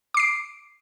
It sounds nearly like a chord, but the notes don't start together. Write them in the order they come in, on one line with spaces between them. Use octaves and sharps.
D6 C7 D7